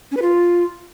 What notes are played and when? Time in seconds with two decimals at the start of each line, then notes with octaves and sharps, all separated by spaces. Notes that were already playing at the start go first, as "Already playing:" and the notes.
0.11 C#4
0.17 B4
0.22 F4